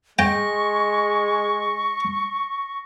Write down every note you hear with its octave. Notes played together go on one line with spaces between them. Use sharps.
G#3 G5 C#6 A#6